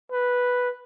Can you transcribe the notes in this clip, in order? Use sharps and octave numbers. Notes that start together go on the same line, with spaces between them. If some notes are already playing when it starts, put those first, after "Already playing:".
B4